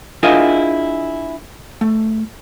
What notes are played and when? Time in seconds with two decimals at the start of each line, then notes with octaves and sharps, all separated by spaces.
0.23 D4 E4 F4 G#4 A#4 D#5
1.81 A3